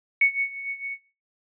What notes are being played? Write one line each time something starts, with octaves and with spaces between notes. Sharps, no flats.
C#7